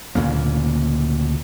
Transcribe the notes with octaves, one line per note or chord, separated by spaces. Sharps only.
D2 A#2 C#3 A#3